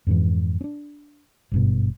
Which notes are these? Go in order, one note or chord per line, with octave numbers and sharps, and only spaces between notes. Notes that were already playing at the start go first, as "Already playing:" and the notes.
F2 G#2 E3
C#4 D4
G#1 G2 B2